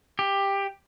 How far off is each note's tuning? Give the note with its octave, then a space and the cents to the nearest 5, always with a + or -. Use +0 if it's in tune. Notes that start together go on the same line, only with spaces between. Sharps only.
G4 +15